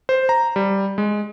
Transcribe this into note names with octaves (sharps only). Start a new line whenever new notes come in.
C5
A#5
G3
G#3